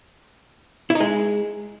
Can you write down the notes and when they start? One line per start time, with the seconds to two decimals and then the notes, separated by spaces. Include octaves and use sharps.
0.90 E4
0.95 D#4
1.00 G#3